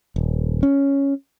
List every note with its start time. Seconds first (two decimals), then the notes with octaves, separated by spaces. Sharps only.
0.16 D#1
0.63 C#4